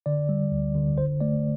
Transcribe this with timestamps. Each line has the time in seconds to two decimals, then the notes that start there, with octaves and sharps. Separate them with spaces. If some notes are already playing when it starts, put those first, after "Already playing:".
0.06 D3 D5
0.29 G3
0.52 D2
0.75 D3
0.98 G1 C5
1.20 A3 D5